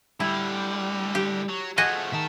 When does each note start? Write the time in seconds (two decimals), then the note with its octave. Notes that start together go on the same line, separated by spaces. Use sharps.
0.20 A2 D3 G3 E4
1.15 G4
1.49 F#3
1.78 F3 A3 F#4 G#4 D#5
2.13 D#3 E5 A5